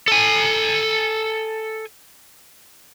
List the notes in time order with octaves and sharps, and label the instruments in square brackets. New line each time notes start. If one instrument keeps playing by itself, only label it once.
[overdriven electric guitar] A4 G#5